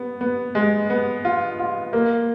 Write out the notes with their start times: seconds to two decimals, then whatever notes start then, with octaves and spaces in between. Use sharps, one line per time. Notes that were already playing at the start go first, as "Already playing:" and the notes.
Already playing: B3
0.21 B3
0.55 G#3
0.90 B3
1.25 F4
1.59 F4
1.93 A#3